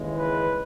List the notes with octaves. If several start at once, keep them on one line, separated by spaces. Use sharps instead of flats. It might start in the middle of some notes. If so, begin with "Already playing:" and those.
Already playing: D#2 C#3 E3 G#3
B4